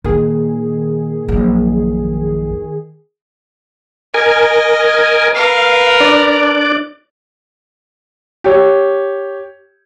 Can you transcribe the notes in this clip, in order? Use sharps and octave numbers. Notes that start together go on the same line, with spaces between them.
A#2 D#3 G#4
A#1 F#2
A#4 D#5 G#5
A#4 B4 F5
D4 D5
G4 C#5